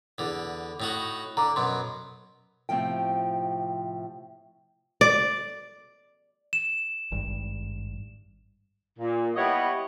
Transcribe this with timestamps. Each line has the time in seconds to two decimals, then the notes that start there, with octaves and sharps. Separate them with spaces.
0.18 E2 D3
0.80 A2 D#4 F#4
1.37 D3 A#5 D6
1.56 F#2 B2 C6
2.69 A2 C3 F3 G5
5.01 D5
6.53 E7
7.12 G#1 G2
8.99 A#2
9.36 G3 B3 E4 C#5 D#5